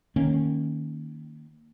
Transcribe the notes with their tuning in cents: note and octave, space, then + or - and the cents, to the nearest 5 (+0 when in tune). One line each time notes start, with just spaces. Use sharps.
D#3 -15 A#3 -15 C#4 -10